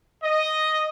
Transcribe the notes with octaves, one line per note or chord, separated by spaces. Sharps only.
D#5